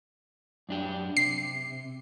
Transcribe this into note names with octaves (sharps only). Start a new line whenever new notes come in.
F#2 D4 G4
C3 C7